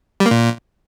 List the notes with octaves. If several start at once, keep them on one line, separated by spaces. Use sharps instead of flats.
G3
A#3
A#2